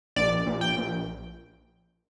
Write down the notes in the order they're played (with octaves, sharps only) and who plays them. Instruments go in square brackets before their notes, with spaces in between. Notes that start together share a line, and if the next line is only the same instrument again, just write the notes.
[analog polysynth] A#1 D5
A#1
G5
A#1